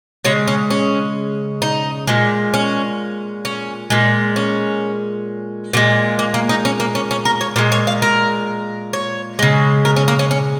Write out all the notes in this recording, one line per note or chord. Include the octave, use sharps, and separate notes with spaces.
C#3 G#3 C#5
C#4
C#4
D#4
A#2 G#3
C#4
C#4
A#2 G#3
C#4
A#2 F3 G#3
A#3
A#3
D#4
C#4
A#3
C#4
C#4
A#4
C#5
A#2 G#3 A#4
C#5
F5
A#4
C#5
C#3 G#3
A#4
C#4
A#3
C#4
C#4